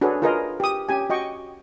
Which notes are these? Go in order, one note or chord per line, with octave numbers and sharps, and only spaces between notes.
D4 F#4 G#4 A4 B4 C#5
F4 G#4 A#4 B4 D#5
G4 D#6
C#4 G4 G#5
F#4 D#5 G5 C#6